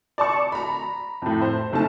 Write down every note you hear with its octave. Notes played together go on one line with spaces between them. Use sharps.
D5 A5 C#6
A#5 B5
F2 A2
C5
F#1 A3 C4 D#4 A5